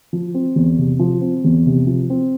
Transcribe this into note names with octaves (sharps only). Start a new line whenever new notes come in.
F3
C4
E2
C3
F3
C4
E2
C3
F3
C4